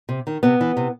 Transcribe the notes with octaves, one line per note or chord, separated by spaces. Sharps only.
C3
D#3
C3 B3
E3
C3